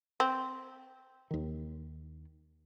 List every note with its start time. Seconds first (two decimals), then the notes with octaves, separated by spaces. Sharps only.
0.20 C4
1.31 D#2 D#3